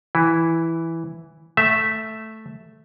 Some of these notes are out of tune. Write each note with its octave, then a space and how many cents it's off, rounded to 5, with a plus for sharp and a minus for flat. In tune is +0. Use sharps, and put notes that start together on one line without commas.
E3 +0 E4 +0
A3 +0 E5 +0